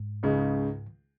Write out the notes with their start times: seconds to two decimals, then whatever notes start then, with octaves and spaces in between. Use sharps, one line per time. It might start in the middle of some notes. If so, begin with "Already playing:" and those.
Already playing: G#2
0.23 C#2 C#3 G#3 D#4